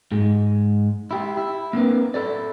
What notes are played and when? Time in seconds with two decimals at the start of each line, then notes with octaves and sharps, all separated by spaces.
0.12 G#2 G#3
1.11 E4 G4
1.37 E4
1.73 A#3 C4 D4 A#4 B4
2.14 E4 A4 D5